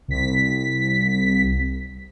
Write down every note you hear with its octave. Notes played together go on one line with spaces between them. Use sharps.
C2 B6